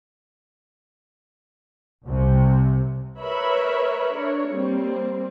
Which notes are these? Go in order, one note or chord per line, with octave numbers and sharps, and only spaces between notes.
C2 C3
A#4 B4 C#5 E5 B5
D4 A#4 C#5
G3 A#3 C4